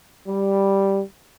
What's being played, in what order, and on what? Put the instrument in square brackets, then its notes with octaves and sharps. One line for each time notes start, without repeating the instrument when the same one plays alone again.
[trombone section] G3